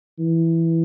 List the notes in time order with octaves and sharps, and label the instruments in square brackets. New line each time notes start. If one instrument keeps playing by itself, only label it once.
[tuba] E3